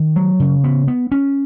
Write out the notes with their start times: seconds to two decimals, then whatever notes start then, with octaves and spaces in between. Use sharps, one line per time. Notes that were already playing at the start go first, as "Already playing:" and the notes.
Already playing: D#3
0.16 F#3
0.40 C#3
0.64 B3
0.88 B3
1.12 C#4